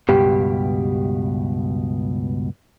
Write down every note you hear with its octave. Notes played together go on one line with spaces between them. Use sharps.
C#2 G2 B2 G4